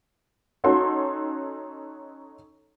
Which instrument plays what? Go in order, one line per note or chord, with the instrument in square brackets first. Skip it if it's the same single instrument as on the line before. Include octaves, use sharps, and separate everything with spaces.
[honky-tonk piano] C#4 D#4 F#4 A4 C6